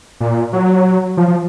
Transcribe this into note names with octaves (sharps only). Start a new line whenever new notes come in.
A#2
F#3
F3
F3